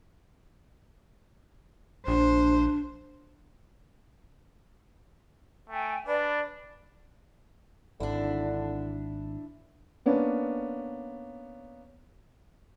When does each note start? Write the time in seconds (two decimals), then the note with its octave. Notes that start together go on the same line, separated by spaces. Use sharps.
2.07 A#1 D4 C5
5.70 A3 G5 G#5
6.07 D4 B4 D5
8.00 G#1 D3 D4 E4
10.06 A#3 B3 C#4 D4